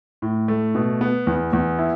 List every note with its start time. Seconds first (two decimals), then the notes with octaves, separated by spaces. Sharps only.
0.22 A2
0.48 A3
0.75 B2
1.01 B3
1.27 E2
1.53 E2
1.79 E4